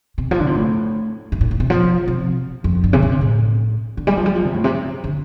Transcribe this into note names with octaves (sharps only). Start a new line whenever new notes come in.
C3
F3
D3
C3
A2
G2
A2
A2
C3
F3
C3
F2
G2
C3
D3
C3
A2
D3
G3
F3
G3
F3
C3
A2
C3
D3